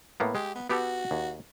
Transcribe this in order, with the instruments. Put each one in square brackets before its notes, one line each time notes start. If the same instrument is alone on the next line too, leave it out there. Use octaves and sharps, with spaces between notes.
[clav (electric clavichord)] A2 A#3 B3
[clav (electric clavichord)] G#3 [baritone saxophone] G4
[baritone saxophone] B3
[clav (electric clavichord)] B3 G4 A4 [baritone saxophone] F#4
[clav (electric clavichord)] D#2